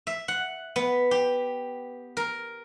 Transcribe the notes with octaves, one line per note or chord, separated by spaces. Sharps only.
E5
F#5
B3
G4
A#4